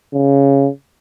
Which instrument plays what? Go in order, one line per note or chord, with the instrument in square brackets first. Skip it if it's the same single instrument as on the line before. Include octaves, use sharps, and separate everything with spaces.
[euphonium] C#3